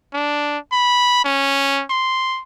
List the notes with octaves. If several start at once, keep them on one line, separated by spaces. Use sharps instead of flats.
D4
B5
C#4
C6